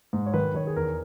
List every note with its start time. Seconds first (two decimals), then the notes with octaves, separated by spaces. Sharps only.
0.13 G#2
0.26 C#5
0.34 D#3 B4
0.54 D#3 C#5
0.67 G#4
0.76 E2 A#4